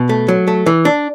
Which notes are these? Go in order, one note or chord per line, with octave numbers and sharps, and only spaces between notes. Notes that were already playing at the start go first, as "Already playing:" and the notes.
Already playing: B2
A3
F#3
A3
E3
D4